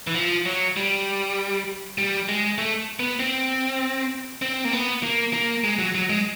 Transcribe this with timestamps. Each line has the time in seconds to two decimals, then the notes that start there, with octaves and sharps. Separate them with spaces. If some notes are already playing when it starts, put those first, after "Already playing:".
0.07 E3
0.15 F3
0.45 F#3
0.76 G3
1.98 G3
2.29 G#3
2.58 A3
2.99 B3
3.19 C4
4.42 C4
4.65 A#3
4.72 B3
5.03 A#3
5.33 A#3
5.64 G#3
5.79 F#3
5.95 F#3
6.10 G#3